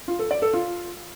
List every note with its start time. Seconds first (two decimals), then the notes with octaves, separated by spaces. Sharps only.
0.08 F4
0.19 A4
0.31 D5
0.42 A4
0.54 F4